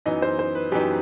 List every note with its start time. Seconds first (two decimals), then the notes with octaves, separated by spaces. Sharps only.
0.06 F#2 E3 B3 D#4 D#5
0.22 C5
0.39 C5
0.55 B4
0.72 F#2 E3 B3 D#4 G4